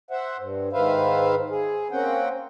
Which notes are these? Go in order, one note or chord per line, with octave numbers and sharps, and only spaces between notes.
C5 E5 F#5
G2
G#2 D#3 B4 C5 E5 F5
G#4
A#3 C4 C#4 F#5 G5